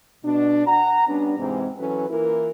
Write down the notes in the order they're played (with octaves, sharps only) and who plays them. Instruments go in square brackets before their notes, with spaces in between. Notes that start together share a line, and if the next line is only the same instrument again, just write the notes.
[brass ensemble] B2 D4
F#5 A#5
G3 B3 C#4 D4
G#2 C3 E3 G#3 C4
E3 F#3 C#4 A4 B4
E3 A#3 E4 F4 A#4